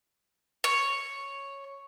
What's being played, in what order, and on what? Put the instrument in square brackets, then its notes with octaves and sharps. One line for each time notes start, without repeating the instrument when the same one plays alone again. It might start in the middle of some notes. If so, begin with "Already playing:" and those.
[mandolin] C#5